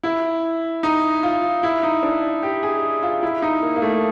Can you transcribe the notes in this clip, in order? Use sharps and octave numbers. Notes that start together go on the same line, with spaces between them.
E4
D#4
F4
E4
D#4
D4
G4
G#4
F4
E4
D#4
A#3
A#3
A3